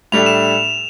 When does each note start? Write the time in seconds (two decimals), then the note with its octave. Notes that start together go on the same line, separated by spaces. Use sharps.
0.12 A2 G3 D4 A4 E5 F7
0.26 E7